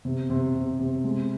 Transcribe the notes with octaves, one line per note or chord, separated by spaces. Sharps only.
C3
C3
C3
C3
G#3